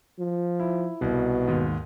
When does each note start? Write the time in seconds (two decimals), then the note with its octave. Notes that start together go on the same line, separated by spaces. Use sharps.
0.19 F3
0.60 E4
1.02 C2 B2
1.48 D#2 G#2